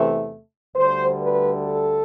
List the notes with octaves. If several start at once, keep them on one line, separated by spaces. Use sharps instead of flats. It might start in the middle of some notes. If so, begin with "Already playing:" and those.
Already playing: E2 C3 E3 A3
D2 D3 G3 C5
B4
A4